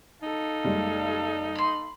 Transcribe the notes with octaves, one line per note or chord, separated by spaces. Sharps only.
D#4 A4 F5
F#1 G3 G#3
B5 C6